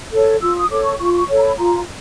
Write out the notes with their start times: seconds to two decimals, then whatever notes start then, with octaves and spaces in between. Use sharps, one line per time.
0.13 A4 C#5
0.41 F4 E6
0.56 D#6
0.70 A4 C#5 D6
0.84 C#6
0.99 F4 C#6
1.14 C#6
1.28 A4 C#5
1.37 A#5
1.42 B5
1.57 F4 A#5